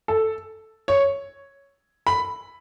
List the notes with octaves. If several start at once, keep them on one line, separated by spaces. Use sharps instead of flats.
A4
C#5
B5